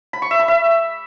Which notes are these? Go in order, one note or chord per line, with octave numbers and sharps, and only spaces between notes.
B5
C#6
E5
B5
E5